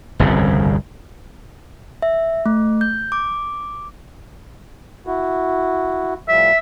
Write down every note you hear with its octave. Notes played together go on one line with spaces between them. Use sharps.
G1 C2 F2 C#3
E5
A3
G6
D6
E4 F#4
A2 F3 G3 E5